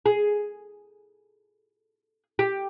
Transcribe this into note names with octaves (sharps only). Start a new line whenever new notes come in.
G#4
G4